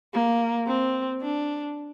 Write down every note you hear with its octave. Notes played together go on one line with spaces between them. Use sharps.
A#3
C4
D4